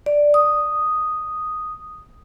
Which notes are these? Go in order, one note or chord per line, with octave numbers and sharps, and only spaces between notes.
D5
D#6